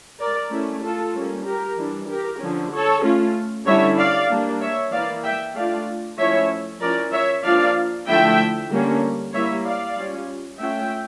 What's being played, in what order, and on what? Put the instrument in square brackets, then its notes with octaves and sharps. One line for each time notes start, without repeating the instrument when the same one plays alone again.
[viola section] A#4 D5
A3 C#4 E4
F4 A4
G3 A#3 C#4
G4 A#4
E3 G3 D4
G4 A#4
D3 F3 C#4
A4 C#5
A3 C#4 F4
D3 G3 C#4 E4 C#5 E5
D5 F5
G3 A#3 D4
C#5 E5
E3 A#3 E4 D5 F5
E5 G5
A3 D4 F4 D5 F5
F3 A3 C#4 E4 C#5 E5
F3 C#4 E4 A#4 D5
C#5 E5
F3 A#3 D4 F4 D5 F5
D3 F3 A3 E4 E5 G5
D3 G3 A#3 C#4
G3 A#3 E4 C#5 E5
D5 F5
G3 C#4 F4
A3 C#4 F4 E5 G5